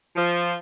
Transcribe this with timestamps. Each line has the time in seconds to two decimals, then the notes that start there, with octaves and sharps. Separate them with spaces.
0.16 F3